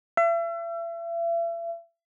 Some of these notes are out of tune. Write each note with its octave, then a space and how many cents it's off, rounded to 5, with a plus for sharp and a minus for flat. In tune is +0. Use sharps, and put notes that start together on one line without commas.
E5 +40